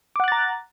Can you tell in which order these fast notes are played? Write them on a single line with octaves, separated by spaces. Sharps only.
D6 F#5 F#6 A6 A#5